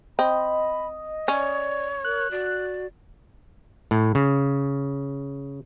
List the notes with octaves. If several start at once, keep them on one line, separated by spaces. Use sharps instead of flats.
C4 D#5 B5
C#4 C#5 D5
A#4 F#6
F#4 D5
A2
C#3